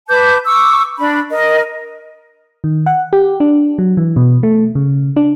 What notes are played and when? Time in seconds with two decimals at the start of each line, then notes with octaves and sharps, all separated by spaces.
0.08 B4 A5 D6 G6
0.46 C#6 D6 E6
0.98 D4 B5
1.32 A#4 D#5
2.64 D#3
2.86 F#5
3.13 G4
3.40 D4
3.78 F#3
3.97 E3
4.16 B2
4.43 A3
4.75 C#3
5.16 D4